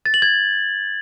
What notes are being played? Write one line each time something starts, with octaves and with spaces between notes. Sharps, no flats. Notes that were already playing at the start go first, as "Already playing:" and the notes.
A6
F#7
G#6